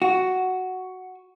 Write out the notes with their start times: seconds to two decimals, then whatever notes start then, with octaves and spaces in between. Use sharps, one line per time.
0.02 F#4